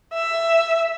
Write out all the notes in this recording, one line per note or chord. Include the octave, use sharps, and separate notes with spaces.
E5